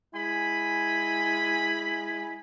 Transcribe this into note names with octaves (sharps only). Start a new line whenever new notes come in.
G#3 E4 G#5 B5